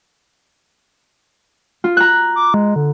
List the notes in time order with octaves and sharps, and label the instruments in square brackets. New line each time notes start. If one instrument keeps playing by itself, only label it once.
[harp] F4
A#5 F#6
[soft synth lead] D6
G#3
D3